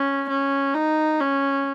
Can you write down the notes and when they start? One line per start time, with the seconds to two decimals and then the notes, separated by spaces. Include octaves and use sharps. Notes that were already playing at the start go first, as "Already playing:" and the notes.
Already playing: C#4
0.29 C#4
0.74 D#4
1.20 C#4